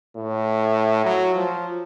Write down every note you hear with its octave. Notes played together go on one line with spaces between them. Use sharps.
A2
F#3
F3